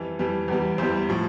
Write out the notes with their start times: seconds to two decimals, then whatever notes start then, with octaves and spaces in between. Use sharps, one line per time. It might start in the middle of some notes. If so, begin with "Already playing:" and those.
Already playing: F2 E3 G3
0.19 F2 E3 G3
0.48 E2 E3 G3
0.78 E2 E3 G3 C5
1.09 A2 F3